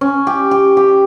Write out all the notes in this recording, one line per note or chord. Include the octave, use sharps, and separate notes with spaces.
C#4
G4
G4
G4